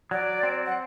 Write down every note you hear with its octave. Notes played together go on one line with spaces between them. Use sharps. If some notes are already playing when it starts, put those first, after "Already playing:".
F#3 D5
C4
F#5